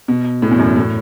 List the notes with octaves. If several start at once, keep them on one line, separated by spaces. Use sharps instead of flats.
B2
A2
E2
F#2
A2